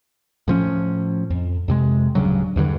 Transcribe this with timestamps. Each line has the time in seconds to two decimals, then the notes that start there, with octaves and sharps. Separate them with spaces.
0.48 A2 F3 C#4
1.30 F2
1.68 F2 C3 G#3
2.15 D1 G2 C#3 F#3
2.56 E2 G2 D3 E3